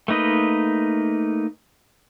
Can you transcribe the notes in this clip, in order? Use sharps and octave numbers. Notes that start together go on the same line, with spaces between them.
A3 A#3 D#4 B4 D#5